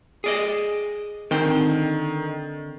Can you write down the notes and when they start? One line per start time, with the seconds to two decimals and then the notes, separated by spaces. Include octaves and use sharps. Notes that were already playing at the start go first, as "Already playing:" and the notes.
0.24 G#4 D5 D#5
1.31 D3 D#3 C4 G5